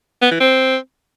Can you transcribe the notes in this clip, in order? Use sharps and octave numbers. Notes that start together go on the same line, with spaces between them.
B3
E3
C4